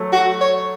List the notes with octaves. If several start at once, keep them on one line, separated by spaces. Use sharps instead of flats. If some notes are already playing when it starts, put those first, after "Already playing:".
Already playing: F#3 A3
F#4
C#5